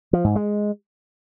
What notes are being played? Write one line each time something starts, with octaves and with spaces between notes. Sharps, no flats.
F3
G#2
G#3